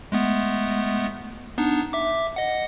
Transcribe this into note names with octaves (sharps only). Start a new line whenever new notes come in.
G#3 A3 B3
B3 D4 D#4
E5 D6
D#5 F#5